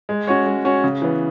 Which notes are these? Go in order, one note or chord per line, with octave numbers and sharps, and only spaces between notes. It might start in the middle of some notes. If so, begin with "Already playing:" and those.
G#3
C#4 F#4 C#5
G#3
C#4 F#4 C#5
C#3
E3 B3